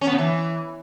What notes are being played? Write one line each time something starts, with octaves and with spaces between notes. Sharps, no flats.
C#4
B3
C#3
E3